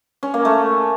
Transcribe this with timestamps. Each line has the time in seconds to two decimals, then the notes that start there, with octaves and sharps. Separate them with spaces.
0.23 C#4
0.34 A#3
0.45 A3